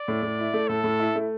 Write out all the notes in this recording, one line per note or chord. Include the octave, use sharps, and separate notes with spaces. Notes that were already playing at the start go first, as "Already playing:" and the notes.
Already playing: D5
A2
A2
E4
A3
A2 A4
A2
E4
A3